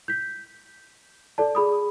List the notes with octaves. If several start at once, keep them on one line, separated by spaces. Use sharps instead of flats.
G6 B6
A4 D5 A5
G#4 B5 D#6